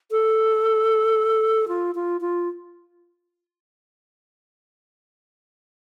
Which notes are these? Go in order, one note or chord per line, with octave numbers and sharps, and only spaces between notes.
A4
F4
F4
F4